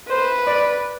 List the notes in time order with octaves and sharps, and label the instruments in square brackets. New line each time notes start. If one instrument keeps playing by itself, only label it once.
[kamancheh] B4 [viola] C5
[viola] D5